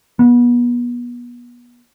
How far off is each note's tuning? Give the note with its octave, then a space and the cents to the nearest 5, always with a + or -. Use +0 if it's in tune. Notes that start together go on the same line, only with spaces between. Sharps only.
B3 -30